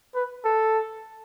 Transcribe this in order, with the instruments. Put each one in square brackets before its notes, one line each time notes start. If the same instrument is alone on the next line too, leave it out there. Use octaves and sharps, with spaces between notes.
[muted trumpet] B4
A4